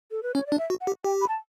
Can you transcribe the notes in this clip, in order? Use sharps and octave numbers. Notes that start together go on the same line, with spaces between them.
A4
B4
C#4 C#5
D5
D4
E5
F#4
F#5
G4
G4 G5
B5
A5